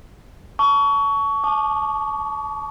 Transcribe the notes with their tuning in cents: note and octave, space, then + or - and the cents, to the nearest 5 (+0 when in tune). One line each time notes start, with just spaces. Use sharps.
A5 +0 C#6 +25
A5 -30 D6 +35